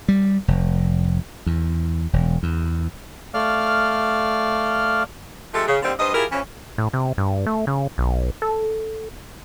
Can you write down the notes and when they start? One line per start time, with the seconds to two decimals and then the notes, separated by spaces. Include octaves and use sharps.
0.08 G3
0.48 F1
1.46 E2
2.13 E1
2.43 E2
3.34 A3 D5 F5 F6
5.54 F3 G#3 A3 G4 A4
5.68 C#3
5.83 D3 D#3 G3 A#3 C4
5.99 G2 B4 C5 D#5
6.14 E4 F4 G4 G#4 A#4
6.32 E3 F3 C#4
6.78 A2
6.93 C3
7.18 G2
7.46 A3
7.67 C#3
7.98 B1
8.42 A4